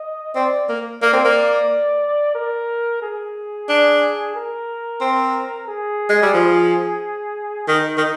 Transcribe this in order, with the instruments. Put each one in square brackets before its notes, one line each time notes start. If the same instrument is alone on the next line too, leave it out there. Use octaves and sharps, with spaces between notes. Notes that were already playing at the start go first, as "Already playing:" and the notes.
Already playing: [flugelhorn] D#5
[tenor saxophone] C4 [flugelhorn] D5
[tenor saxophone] A#3
[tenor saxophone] A#3 [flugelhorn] D5
[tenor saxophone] C4
A#3
[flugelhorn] A#4
G#4
[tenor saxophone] D4
[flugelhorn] A#4
[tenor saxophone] C4
[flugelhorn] G#4
[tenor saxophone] G#3
G3
F3
[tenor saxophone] D#3 [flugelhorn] D#4
[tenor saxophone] D#3